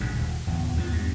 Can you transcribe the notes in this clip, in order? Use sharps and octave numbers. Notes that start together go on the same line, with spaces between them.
A#1 G#2 C#3
D#1
D1 E2
E2 G#2 D3 F3
E2 G2